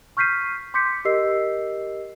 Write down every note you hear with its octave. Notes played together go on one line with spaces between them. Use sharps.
C#6 F6 G6 B6 C7 D#7
C6 D6 G6 B6 C#7
G4 A#4 D#5 E6 C7